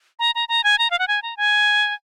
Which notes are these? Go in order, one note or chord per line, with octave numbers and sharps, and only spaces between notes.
A#5
A#5
A#5
G#5
A#5
F5
F#5
G#5
A#5
G#5